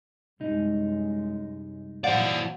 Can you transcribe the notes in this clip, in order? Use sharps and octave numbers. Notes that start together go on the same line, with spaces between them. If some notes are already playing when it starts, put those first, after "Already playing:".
C2 F#2 G#3 D#4
A#2 E3 F#3 C5 D5 F5 F#5